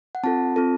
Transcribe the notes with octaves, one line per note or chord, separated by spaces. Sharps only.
F#5
C4 F4 A4 A5
C4 F4 A4